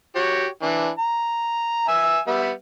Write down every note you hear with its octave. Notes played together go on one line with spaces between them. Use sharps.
F#4 G4 C#5
E3 D4
A#5
E5 G#5 E6
G3 B3 E5